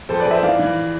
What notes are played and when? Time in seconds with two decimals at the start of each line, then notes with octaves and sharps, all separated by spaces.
0.09 F2 A4 C5
0.20 B4 D5
0.25 F2
0.31 C5 E5
0.43 E3 D5 F5
0.59 E3